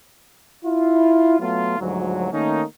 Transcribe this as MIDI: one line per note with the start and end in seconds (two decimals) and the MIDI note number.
0.65 1.37 64
0.65 1.37 65
1.39 1.77 54
1.39 1.77 57
1.39 1.77 59
1.39 1.77 65
1.79 2.29 38
1.79 2.29 44
1.79 2.29 53
1.79 2.29 54
2.31 2.63 51
2.31 2.63 57
2.31 2.63 58
2.31 2.63 61
2.31 2.63 63